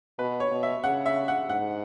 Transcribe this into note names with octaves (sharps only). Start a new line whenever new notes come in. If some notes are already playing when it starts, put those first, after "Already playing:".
B2 B4
C#5
B2
E5
C#3 F#5
E5
F#5
G#2 F#5